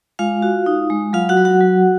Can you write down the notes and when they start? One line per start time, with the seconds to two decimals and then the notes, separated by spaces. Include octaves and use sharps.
0.19 G#3 F4 F5
0.42 F#4
0.66 D#4
0.90 G#3
1.13 F#3 F4 F5
1.29 F#4 F#5
1.37 F#3
1.45 F#4 F#5
1.60 F#3